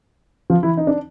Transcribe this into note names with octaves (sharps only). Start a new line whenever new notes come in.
F3 F4
E3 E4
D#4
D4